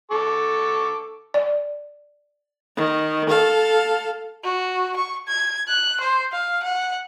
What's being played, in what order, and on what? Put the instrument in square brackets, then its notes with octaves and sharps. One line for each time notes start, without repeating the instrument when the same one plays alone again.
[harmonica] A4 C#6 D6
[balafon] D5
[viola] D#3
A4 F5
[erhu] F#4
C#6
G#6
F#6
C5
F5
F#5